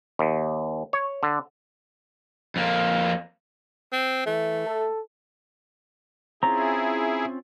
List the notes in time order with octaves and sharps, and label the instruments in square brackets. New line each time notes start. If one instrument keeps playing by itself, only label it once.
[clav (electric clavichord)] D#2
C#5
D3
[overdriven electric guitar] F2 A#3
[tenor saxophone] C4
[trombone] E3 [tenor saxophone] A3
[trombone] A4
[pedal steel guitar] C4 C#4 F4 [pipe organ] E4 G#4 [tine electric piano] A#5